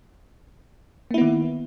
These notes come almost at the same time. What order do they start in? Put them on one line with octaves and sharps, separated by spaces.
A#3 E4 B3 D#3